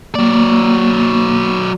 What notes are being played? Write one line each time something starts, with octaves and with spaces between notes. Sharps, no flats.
F#3 A#3 D5